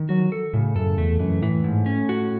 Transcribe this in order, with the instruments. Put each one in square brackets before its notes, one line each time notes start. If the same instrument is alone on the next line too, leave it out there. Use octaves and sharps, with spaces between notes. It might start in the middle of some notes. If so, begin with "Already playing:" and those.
Already playing: [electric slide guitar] D#3
[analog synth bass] F#3 [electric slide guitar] F#4
[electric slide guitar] A4
[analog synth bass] A2 [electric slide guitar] C#3
[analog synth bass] F#2 [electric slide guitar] A4
[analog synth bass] E2 [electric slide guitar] A3
[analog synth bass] F#2 [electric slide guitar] E3
[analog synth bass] A2 [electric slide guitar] E3
[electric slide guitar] G#2
C#4
F#4